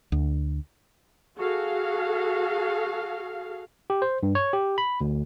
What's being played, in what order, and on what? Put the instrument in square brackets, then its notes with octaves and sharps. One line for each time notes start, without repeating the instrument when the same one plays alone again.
[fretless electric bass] D2
[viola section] F#4 G#4 A4 F5
[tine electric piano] G4
C5
G2
C#5
G4
B5
D2